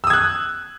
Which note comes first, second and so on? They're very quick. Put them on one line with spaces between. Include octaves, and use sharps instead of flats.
E6 D#6 G#6 F#6